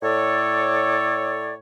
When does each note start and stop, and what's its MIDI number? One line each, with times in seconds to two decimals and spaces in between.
0.02 1.54 45
0.02 1.54 69
0.02 1.54 73
0.02 1.54 74